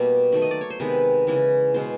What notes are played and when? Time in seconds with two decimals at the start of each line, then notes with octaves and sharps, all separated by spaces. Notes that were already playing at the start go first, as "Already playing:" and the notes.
Already playing: B2 G3 A#3
0.32 D#3 F#3 A3
0.42 D#5
0.51 D5
0.61 C#5
0.70 C5
0.80 C3 D#3 G#3 B3 B4
1.27 C#3 E3 G#3
1.74 B2 G#3 B3 C5